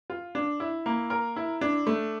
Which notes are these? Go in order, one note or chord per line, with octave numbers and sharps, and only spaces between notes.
F4
D4
E4
A#3
A#4
E4
D4
A3